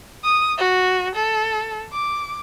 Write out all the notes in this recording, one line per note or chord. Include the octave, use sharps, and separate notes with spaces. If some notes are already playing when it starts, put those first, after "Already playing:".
D#6
F#4
A4
D6